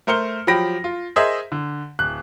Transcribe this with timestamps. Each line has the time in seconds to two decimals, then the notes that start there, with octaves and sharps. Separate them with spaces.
0.07 A3 A#4 C5 F6 C#7 G7
0.47 F3 F#3 G4 B5 A#6 D7
0.84 F4
1.16 G#4 A#4 C5 D#5 E5
1.52 D3
1.99 D1 F#6